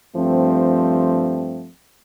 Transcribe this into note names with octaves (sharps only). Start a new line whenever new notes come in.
G2 F3 A3 C4